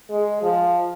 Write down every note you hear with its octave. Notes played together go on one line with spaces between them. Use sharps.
G#3
F3